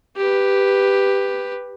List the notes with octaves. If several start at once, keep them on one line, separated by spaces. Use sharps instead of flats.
G4 B4